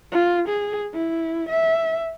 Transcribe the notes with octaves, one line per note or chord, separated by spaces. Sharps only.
F4
G#4
E4
E5